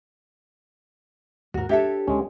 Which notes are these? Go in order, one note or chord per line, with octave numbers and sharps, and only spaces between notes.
D#2 G#2 F#4 A#4
D4 G4 A4 C#5 E5 G5
D2 G#3 C#4